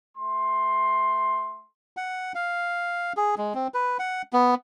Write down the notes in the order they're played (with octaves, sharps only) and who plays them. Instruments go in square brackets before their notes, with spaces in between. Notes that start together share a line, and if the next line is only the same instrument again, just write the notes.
[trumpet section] A3 C6
[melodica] F#5
F5
G#4
G#3
C4
B4
F#5
B3